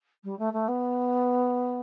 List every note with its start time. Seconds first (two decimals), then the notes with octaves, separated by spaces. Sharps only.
0.24 G3
0.39 A3
0.53 A3
0.68 B3